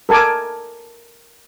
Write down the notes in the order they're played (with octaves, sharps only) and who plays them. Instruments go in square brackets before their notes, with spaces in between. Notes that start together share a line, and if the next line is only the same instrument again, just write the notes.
[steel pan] A4 A#4 G#5 A5 D6